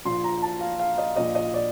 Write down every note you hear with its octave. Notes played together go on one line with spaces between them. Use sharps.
A#1 A#2 F3 C6
A#5
A5
F5
F5
D#5
A#1 A#2 F3 D#5
D#5
D5